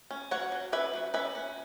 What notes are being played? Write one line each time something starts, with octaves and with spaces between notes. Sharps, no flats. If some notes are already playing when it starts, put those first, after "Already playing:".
C#4
F#3 C#5 F#5
F#3
C#4 B4 E5
F#3
C#4 B4 E5
C#4